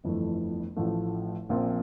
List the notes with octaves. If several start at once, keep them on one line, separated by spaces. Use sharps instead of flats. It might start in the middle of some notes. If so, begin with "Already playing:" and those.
G1 F2 E3 A3
A1 A2 F3 A3
A#1 A#2 F3 C4